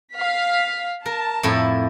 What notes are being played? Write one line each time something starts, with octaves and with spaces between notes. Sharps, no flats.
F5 B6
A#4 A5
F2 A2 E4